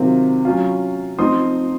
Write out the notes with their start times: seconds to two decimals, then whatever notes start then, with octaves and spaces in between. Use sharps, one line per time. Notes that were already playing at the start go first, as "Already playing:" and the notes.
Already playing: C3 D#3 F#3 C4 F4
0.45 F#3 C#4 F4
1.19 F3 C4 D#4 C6 D#6